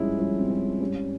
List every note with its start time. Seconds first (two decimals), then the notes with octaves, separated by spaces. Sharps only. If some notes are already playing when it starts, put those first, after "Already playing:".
Already playing: G2 F3 G#3 C#4 E4
0.19 G2 F3 G#3 C#4
0.39 C4
0.50 C#4
0.81 G#2 G3 C#4